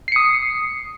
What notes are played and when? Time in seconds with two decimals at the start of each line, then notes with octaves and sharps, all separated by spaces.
0.08 C7
0.12 C#7
0.16 D#6